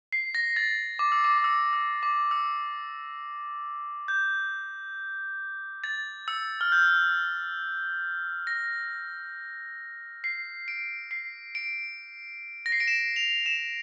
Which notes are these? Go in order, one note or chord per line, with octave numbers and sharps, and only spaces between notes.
C7
A#6
A6
D6
E6
D6
D6
E6
E6
D6
E6
G6
A6
E6
F6
G6
A#6
C7
D7
C7
D7
A#6
C7
D7
E7
F7
E7